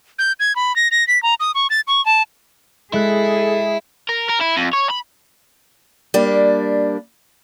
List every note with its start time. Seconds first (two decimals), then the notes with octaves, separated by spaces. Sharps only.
0.19 G6
0.40 G#6
0.56 B5
0.76 A#6
0.91 A#6
1.08 B6
1.23 A#5
1.40 D#6
1.55 C#6
1.70 A6
1.87 C#6
2.06 A5
2.93 G#3 E4 G#4 A4 F#6
4.09 A#4
4.29 A#4
4.41 E4
4.57 F2
4.73 C#5
4.90 B5
6.14 G3 A#3 D4